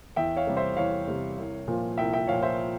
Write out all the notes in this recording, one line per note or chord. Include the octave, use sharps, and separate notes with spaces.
E2 E5 G5
C#5 F5
C3 G3
C5 E5
E2 C#5 F5
C3 G3
C2
A#2 F3
C2 E5 G5
E5 G5
A#2 F3 C#5 F5
C5 E5